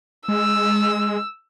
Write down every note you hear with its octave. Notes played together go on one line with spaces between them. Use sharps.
G#3 E6